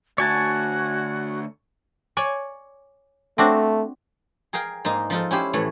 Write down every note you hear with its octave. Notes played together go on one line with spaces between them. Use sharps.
D2 F#4 C#5 G#5 A5
C#5 D5 G#5
A3 C4 D4 F#4
G#4 A#4 F5 G5
G#2 A#3 D#4
F3 D#4 F4 A4
C#4 E4 G4 C5
A2 E3 A3 C#5